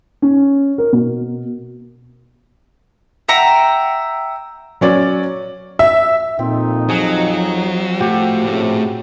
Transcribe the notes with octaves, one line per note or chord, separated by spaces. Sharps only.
C#4
A#4
B2
E5 F#5 G5 A#5
F#3 C#4 D5
E5
F2 A#2 C4 D#4
F3 F#3 G#4
A2 A3 F#4 G4
C3 C#4 G#4